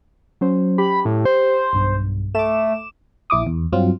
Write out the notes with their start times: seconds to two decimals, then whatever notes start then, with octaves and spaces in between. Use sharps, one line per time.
0.41 F#3 C#4 C5
0.78 G4 B5
1.05 A2
1.25 C5
1.73 B1 G2
2.35 A3 D6 E7
3.30 A#1 E4 D6 D#6
3.47 E2
3.72 G2 F#3 C4 F4